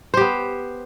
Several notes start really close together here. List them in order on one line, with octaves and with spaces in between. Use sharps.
C5 G4 B3